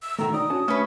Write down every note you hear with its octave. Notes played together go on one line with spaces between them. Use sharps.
E6
B2 D#3 A3 A#5
D#4 D5 D#6
C#4 F#4 A5
A3 C#4 B4